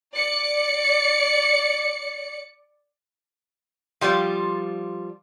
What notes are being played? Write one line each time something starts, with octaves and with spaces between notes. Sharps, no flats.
D5 C#7
F3 G3 F4 D5